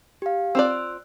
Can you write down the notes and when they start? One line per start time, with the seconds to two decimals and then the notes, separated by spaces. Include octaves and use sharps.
0.22 G4 F5
0.55 C4 F4 D5 E6 F#6